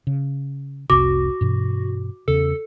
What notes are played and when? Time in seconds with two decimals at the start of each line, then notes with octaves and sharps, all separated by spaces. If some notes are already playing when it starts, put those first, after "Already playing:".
0.07 C#3
0.90 F1 C2 C3 F#4 D6
1.41 G2 B2 E3
2.28 E2 C#3 A4